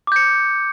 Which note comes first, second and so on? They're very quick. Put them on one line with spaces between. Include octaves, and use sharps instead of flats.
D6 G6 C#7